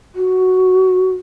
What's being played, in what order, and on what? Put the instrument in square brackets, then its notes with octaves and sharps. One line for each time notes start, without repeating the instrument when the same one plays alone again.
[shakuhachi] F#4